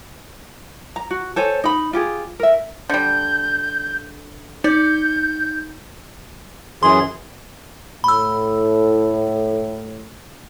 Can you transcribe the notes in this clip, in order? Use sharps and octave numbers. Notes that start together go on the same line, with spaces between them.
A#5
F#4
A4 C5 C#5 G#5
D#4 B5
F4 G4 G#4
A#4 E5
D3 G3 G6
D#4 D5 G6
F#2 E3 G#4 C6
A2 B5 E6